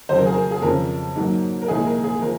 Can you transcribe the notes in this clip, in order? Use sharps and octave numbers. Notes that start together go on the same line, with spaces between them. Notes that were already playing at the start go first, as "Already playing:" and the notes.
F2 C#3 F#3 C5
A#4
G#4
A#4
G#4
F2 C#3 F3 A#4
G#2 F#3 A#3
A#4
C2 A#2 F3 G#3 G#4
A#4
G#4
F3 A#4